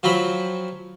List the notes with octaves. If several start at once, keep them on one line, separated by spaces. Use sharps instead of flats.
F3 F#3 C4 B5